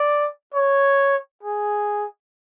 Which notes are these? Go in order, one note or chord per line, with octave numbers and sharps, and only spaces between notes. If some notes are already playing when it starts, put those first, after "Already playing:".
Already playing: D5
C#5
G#4